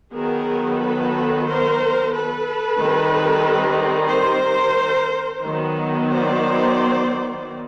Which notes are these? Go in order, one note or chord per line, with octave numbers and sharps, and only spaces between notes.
D#3 F#3 B3 G#4 A#4
A4 B4
A#4 C5
A4 B4
D#3 G3 C4
A#4 C5
D#3 F#3 B3
C5 D5